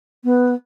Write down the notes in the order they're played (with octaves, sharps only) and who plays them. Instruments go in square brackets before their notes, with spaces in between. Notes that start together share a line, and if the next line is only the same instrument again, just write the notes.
[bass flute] B3